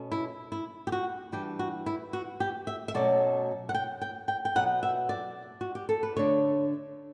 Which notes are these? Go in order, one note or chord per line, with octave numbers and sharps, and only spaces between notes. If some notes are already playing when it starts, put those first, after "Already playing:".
Already playing: B2 A3 C#4
E4
E4
G4
F#4
E3 G3 D4 G4
F#4
E4
F#4
G4
E5
E5
B2 F#3 A3 C#4 D5
F#5
G5
G5
G5
G5
B2 F#3 B3 F#5
E5
D5
F#4
G4
A4
B4
D3 A3 D4 C#5